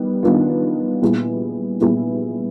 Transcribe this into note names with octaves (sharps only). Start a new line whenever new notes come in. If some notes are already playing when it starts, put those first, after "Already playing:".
Already playing: D#3 G3 B3
D#3 G3 B3 D4 F4
A#2 G3 B3 E4 G#4
A#2 G3 B3 E4 G#4